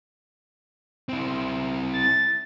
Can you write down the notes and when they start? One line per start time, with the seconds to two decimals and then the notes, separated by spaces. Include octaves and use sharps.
1.09 C4 E4
1.93 A6